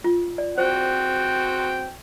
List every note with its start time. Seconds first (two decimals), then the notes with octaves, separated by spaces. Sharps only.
0.04 F4
0.38 D5
0.58 C4 F#4 C5 G5